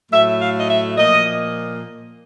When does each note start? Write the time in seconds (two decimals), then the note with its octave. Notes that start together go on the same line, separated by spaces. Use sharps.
0.11 A2 F#3 A3 E5
0.39 F5
0.59 D#5
0.69 E5
0.97 A#2 F3 A#3 D#5